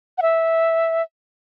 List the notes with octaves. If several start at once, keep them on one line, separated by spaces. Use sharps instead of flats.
F#5
E5